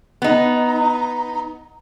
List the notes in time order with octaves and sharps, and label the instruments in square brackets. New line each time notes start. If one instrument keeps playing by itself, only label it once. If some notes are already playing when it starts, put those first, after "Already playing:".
[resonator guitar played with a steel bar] B3 D#4